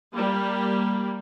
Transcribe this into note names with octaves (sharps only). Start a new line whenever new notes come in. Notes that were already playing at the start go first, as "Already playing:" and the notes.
G3 A#3